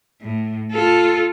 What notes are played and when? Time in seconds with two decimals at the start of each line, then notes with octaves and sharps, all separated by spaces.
0.21 A2
0.72 F4 A4